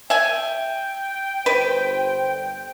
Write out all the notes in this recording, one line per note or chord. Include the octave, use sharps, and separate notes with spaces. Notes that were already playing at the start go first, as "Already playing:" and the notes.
E5 G5 G#5
G1 B4 C5